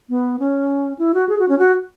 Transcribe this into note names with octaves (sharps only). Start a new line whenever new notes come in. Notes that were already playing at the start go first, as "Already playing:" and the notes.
B3
C#4
E4
F#4
G#4
F#4
C#4
F#4